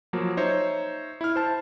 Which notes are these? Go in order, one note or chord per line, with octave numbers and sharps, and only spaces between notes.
F3 F#3 A#3
D#4 C5 C#5 E5
E4 F6
C5 A5